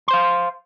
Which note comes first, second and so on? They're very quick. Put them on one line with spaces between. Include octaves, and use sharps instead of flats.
C6 C5 F5